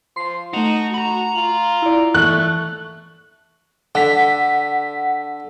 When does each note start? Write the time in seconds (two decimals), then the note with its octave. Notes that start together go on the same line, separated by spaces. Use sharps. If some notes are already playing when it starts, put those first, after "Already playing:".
0.16 F3 C6 C7
0.54 A3 D#4 F#4 F7
0.94 F#4 A#5 B5
1.35 F4 F#7
1.82 E4 D5
2.14 E3 A3 C#6 F#6
3.95 D3 F#5 B6